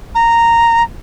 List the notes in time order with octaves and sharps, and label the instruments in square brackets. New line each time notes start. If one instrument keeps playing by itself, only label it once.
[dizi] A#5